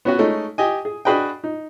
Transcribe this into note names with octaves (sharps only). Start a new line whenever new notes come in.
B3 C#4 F#4
G#3 A3 C#4 D#4
G4 D#5 G#5
G#4
D4 F#4 G#4 B4 D#5 G5
D#4